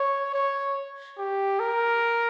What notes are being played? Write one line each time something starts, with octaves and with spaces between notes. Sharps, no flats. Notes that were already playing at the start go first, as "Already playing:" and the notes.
Already playing: C#5
C#5
G4
A#4